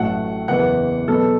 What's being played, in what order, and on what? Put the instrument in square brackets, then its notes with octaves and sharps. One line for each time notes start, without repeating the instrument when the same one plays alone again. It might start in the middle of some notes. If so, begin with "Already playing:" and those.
Already playing: [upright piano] A1 A2 F#3 A3 F#5
F#1 E2 E3 F#5
E2 B2 F#3 B3 A4